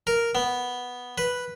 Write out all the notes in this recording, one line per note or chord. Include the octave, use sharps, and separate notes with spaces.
A#4
B3
B4